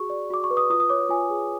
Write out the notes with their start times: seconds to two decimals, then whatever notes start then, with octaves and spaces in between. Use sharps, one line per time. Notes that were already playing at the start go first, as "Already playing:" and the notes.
Already playing: F#4 G#4 C#6
0.10 D5
0.30 F#4 D6
0.44 C#6
0.50 B4
0.57 D#6
0.70 F4 D#6
0.80 D#6
0.89 C#5 D6
1.09 F4 G#5
1.30 G#4